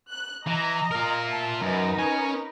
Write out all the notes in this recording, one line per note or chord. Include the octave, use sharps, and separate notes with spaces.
F#6
E3 D#5 A#5
F4 A#4
E5 A5
F#2 D#4 A#4 B4
C#4 G#5